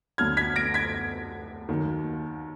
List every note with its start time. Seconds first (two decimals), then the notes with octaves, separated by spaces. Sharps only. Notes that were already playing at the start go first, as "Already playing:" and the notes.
0.18 D2 D3 F#3 F6 G#6
0.37 G#6 B6
0.56 A#6 D7
0.74 G#6 B6
1.69 D#2 D#3 F#3